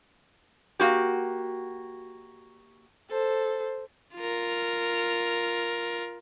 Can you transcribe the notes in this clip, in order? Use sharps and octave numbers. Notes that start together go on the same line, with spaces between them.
A#3 F#4 G4
A4 C5
F4 A#4